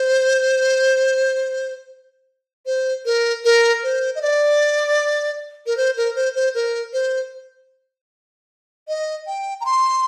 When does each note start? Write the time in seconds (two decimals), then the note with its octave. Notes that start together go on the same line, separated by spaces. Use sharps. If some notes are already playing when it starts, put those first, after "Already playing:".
Already playing: C5
2.66 C5
3.05 A#4
3.45 A#4
3.83 C5
4.15 D#5
4.22 D5
5.66 A#4
5.77 C5
5.97 A#4
6.15 C5
6.36 C5
6.55 A#4
6.93 C5
8.88 D#5
9.27 G5
9.61 A#5
9.65 C6